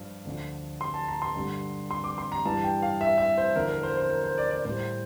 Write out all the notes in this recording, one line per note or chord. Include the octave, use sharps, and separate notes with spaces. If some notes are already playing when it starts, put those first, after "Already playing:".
Already playing: G2 F3
D2 D3 F3
C6
A5
A#5
C6
G2 D3 G3
C6
D6
C6
A#5
G2 E3 G3 A5
G5
F5
E5
E5
C5
E2 D3 F3 A#4
A#4
C5
C5
A#4
C5
D5
D5
A2 G3 C5